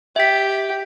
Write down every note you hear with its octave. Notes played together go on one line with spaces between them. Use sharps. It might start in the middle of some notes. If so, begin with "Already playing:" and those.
G4 E5 B6